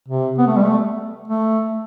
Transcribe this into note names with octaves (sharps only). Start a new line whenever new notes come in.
C3
B3
A3
G3
A3
A3